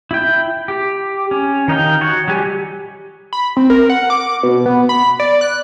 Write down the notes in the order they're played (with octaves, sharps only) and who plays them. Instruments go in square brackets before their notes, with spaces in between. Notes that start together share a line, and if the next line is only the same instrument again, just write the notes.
[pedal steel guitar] E4 G5
G4
C#4
D#3 D#4 F5 G5
F#4 C#5
F#3 G3 G4 G#5
[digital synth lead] B5
C4
A#4
F#5
D6
B2
B3
B5
D5
F#6